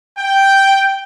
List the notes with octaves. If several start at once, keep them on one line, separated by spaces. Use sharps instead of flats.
G5